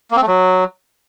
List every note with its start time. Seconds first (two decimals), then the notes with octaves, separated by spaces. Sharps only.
0.11 A#3
0.17 C4
0.22 A3
0.28 F#3